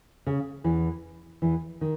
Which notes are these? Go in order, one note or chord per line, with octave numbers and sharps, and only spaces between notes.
C#3
E2 E3
E2 E3
D#3